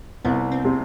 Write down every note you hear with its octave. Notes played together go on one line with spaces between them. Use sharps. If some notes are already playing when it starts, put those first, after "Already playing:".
C2 B3
C4
C3